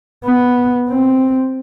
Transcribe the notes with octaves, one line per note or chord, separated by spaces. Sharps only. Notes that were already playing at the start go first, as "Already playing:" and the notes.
B3
C4